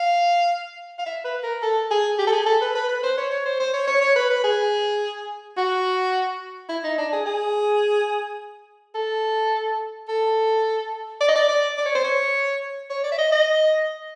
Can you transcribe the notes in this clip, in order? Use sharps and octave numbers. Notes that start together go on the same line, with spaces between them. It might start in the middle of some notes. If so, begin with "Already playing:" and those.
Already playing: F5
F5
E5
B4
A#4
A4
G#4
G4
A4
G#4
A4
B4
B4
B4
C5
C#5
C#5
C5
C5
C#5
C#5
C#5
B4
B4
G#4
F#4
E4
D#4
D4
G#4
G#4
A4
A4
D5
D#5
D5
D5
D5
C#5
C5
C#5
C#5
D5
E5
D#5
D#5